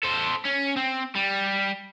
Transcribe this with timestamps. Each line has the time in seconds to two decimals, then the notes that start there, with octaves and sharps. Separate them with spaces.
0.03 A4 C5
0.45 C#4
0.77 C4
1.15 G3